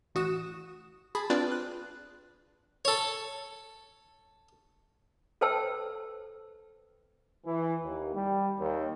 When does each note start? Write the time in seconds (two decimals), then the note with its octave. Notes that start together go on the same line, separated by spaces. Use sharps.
0.15 A1 F#4 D#6 E7
1.15 G#4 A5 B5
1.30 C4 D4 F4 B4 D5
1.52 F#6
2.85 A4 C#5
5.41 A4 B4 C5 G5 A5 E6
7.46 E3
7.83 D#2
8.15 G3
8.59 D#2